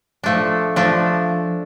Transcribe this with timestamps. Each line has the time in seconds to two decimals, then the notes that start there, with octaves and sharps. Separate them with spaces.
0.24 F3 A3 D4
0.76 F3 A3 D4